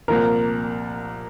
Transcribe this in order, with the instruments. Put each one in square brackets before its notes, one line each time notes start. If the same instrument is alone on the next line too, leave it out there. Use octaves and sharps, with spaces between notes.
[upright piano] C2 A#2 F3 A#3 [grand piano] A#4